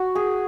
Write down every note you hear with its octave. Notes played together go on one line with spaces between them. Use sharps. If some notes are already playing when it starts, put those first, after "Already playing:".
Already playing: F#4
G#4